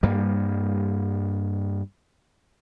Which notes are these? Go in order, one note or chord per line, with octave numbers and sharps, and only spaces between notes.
G2 G3 A#3